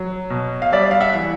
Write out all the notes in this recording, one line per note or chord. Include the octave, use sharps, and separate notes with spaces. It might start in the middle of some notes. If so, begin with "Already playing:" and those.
Already playing: F#3
B2
F5
G3 D5 E5
F5
E5 F#5
E3